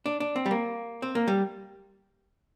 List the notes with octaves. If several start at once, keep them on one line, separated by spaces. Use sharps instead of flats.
D4
D4
C4
G3
A#3
C4
A#3
G3